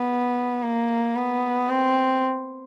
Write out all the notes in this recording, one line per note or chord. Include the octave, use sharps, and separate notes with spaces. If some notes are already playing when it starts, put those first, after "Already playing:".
Already playing: B3
A#3
B3
C4